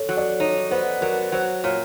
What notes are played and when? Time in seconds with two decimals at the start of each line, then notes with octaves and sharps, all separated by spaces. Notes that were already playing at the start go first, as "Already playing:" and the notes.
Already playing: A4 C#5
0.09 F#3
0.17 D5
0.40 D#4 C#5
0.71 B3 C5
1.01 F#3 A#4
1.32 F#3 C5
1.64 A#2 C#5